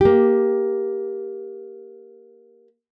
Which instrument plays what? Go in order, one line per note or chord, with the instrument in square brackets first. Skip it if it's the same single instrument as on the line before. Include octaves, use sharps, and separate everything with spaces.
[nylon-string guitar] A#3 G4